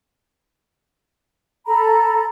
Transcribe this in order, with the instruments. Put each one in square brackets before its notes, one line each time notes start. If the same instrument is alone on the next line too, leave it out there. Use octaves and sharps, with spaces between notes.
[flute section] A4 A#5 B5